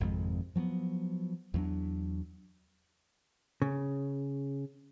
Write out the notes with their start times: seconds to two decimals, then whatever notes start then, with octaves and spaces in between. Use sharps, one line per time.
0.01 G#1 F2 C3 G#3
0.56 F3 F#3 A3 B3
1.54 E2 F#3 D4
3.62 C#3